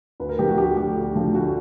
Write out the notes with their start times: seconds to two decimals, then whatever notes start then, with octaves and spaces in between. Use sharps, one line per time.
0.20 D2 B4
0.29 A#4
0.39 D3 F3 A3 G4
0.49 F#4
0.58 D2 G4
0.77 D3 F3 A3 G4
0.96 D2
1.15 D3 F3 A3
1.34 D2 F#4